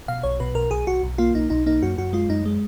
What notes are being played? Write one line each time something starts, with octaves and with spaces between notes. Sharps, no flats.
B2 F5
B1 C#5
B2 B4
B1 A#4
B1 G#4
B1 F#4
B1
A#3 F4
B1 D#4
B1 D#4
A#3 D#4
F#2 F#4
F#2 F#4
G#3 F4
F#2 D#4
G#3